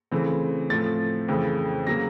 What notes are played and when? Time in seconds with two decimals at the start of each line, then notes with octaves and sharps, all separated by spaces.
0.12 C#3 E3 A3 C4
0.70 A2 F3 A3 C4 A6
1.28 F2 C#3 E3 A3
1.87 C#3 F#3 A#3 A#6